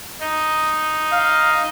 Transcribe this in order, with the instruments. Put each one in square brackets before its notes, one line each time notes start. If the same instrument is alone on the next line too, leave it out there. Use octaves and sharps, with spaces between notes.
[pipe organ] D#4
[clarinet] F5